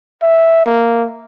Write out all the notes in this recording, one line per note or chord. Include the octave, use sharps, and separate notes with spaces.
E5
A#3